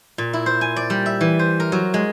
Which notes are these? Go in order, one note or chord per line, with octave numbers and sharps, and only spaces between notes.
A#2
E4
C5
G#5
D5
G3
E5
E3
C5
A#4
F#3
G#3